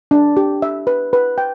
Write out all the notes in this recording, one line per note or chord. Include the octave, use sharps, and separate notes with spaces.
D4
G4
E5
B4
B4
G5